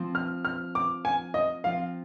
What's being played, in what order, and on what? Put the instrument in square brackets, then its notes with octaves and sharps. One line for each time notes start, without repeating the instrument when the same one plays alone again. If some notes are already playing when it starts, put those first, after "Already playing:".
Already playing: [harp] F3 C4 F4
[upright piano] F6
F6
D6
G#5
D#5
[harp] F3 C4 F4 [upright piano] F5